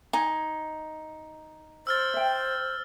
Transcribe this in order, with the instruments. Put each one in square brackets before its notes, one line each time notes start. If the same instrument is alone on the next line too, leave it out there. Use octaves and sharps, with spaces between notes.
[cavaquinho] D#4 [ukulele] G#5
[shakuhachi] C5 [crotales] E6 F6 A6
[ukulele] E5 G5